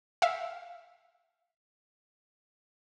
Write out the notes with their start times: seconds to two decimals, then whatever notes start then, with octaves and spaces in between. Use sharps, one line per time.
0.22 E5 F5